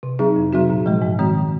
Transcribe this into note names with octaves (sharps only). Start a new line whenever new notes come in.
C3
F#3 C4 D#4 G#4
F2
C3 F#3 C4 F#4
A#2
F3 G#3
G#2
D#3 G#3 C4 F#4